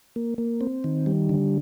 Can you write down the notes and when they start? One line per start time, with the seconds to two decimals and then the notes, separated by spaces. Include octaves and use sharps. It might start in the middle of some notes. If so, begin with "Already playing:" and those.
0.16 A#3
0.38 A#3
0.61 C4
0.84 D#3
1.06 G3
1.29 D3